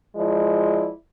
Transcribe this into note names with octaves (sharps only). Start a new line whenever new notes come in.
F3 G#3 E4 D5